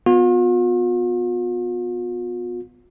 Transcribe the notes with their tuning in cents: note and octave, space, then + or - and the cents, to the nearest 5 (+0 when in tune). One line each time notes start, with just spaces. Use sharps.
B3 +5 F4 +45